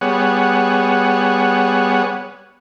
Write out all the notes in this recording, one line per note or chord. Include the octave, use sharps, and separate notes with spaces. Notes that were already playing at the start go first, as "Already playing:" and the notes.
G3 B3 G#4 C#5 F#5